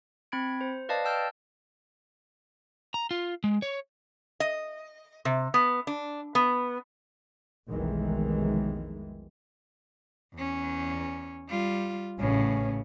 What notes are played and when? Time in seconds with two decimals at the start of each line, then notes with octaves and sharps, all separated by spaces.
0.32 C4 B5 G#6 D7
0.61 C5
0.89 B4 D5 D#5 F5 A5
1.05 G5 A5 E6 F6 G6
2.94 A#5
3.11 F4
3.44 G#3
3.62 C#5
4.40 D#5
5.25 C3
5.54 B3
5.87 D4
6.35 B3
7.69 F1 B1 D#3 E3 G#3
10.34 E2 C#4
11.49 G3 F4
12.20 A1 A2 C#3 C#4